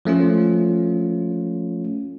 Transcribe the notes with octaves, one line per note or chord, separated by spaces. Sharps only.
F3 A3 C#4 F4